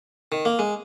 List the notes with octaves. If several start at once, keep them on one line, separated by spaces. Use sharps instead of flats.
D#3
A#3
G#3